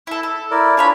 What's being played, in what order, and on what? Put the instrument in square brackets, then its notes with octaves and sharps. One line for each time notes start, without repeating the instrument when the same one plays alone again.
[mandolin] E4 A4
A4
[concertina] E4 A#4 D5
[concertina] D4 F4 [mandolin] G#4 C#5 B5